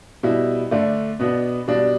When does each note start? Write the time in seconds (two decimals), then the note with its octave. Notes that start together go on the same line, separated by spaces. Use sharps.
0.23 B2 G3 E4
0.71 D3 A3 D4
1.19 B2 B3 D4
1.68 B2 G3 D4